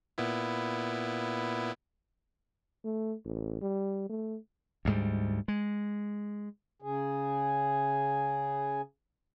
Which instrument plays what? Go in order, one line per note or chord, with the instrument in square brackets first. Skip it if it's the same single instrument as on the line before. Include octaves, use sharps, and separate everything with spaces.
[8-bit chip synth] A#2 B3 E4
[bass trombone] A3
A1
G3
A3
[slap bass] D2 G#2 G3
G#3
[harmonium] C#3 G#4